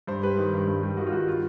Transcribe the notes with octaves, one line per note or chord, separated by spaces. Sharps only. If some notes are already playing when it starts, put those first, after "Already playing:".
G2 C5
G3 B4
D#3
G2
G2
G3
D#3 F#4
F4
G2 F#4
F4